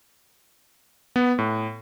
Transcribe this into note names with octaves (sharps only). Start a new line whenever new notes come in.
B3
A2